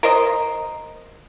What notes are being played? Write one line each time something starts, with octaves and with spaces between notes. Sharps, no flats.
A#4 C5 D#5